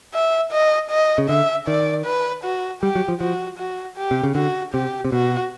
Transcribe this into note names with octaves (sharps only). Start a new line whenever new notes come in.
E5
D#5
D#5
C#3
D3 E5
D#3 D5
B4
F#4
G3 G4
F#3
F3
F3 F#4
F#4
G4
C3
C#3
D3 F#4
C3 G4
C3
B2 F#4